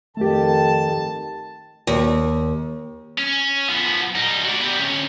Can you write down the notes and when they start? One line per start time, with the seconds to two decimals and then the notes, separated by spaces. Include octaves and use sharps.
0.17 F2 D#3 A3 G4 A5
1.87 D#2
3.18 C#4
3.69 F3 B3
4.16 G3 D#4
4.44 F#4 D5
4.61 B3 G4
4.80 D2 C#4